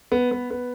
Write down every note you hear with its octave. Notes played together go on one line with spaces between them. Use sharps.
B3
B3
B3